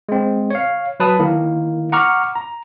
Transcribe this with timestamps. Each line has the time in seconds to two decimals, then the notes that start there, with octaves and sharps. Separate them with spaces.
0.09 G#3 C4
0.50 C#5 F5
1.00 F#3 B4 A5 D#6
1.19 D#3 A#3 E4
1.92 F#5 A#5 C#6 D6 F6
2.35 A#5